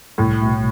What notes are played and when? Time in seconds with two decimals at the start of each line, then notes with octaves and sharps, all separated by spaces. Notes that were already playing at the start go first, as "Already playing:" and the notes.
0.18 C2 A2
0.41 B2 A3